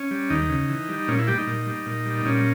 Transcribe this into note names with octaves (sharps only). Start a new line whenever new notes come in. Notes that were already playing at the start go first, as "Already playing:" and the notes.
Already playing: C#4
G3
D#2 D#4
C#3
E3
G3
A#2 C#4
E4
G3 G4
D#4
A#2
G3
A#2
G3
A#2 C#4